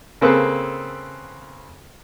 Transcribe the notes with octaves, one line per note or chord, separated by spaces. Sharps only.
C#3 A#3 C4 G#4 A4 B4